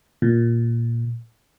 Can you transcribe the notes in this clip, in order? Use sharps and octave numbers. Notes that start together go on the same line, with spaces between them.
A#2